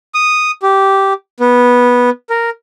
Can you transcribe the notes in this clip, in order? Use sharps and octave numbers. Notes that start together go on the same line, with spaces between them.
D#6
G4
B3
A#4